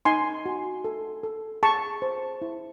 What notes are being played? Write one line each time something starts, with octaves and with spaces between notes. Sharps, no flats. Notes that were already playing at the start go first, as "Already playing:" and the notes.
D#4 G#5 C6
F#4
A4
A4
G#4 A5 C#6
C5
E4